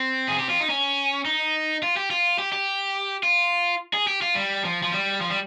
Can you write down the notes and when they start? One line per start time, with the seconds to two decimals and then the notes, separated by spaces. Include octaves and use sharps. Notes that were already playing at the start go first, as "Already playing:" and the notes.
Already playing: C4
0.28 G#4
0.39 G4
0.49 F4
0.60 D#4
0.70 C#4
1.26 D#4
1.83 F4
1.97 G4
2.11 F4
2.39 G4
2.53 G4
3.23 F4
3.94 G#4
4.07 G4
4.22 F4
4.35 G3
4.65 F3
4.83 F3
4.92 G3
5.21 F3
5.30 G3